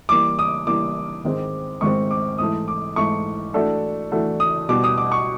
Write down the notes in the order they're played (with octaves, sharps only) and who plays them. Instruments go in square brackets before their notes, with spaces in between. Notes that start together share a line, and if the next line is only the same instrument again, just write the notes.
[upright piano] E3 G3 A#3 [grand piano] D6
[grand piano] D#6
[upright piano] E3 G3 A#3 [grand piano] D6
[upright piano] G#2 D#3 G#3 C4
[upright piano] G#2 D#3 G#3 C4 [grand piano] C#6
[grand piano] D6
[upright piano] G#2 E3 A3 [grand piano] D#6
[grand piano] D6
[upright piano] G#2 E3 A3 [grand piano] C#6
[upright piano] E3 A3 D4 F#4 A4
E3 A3 D4 F#4 A4
[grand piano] D#6
[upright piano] B2 G3 B3 [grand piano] D6
[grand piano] D#6
D6
C#6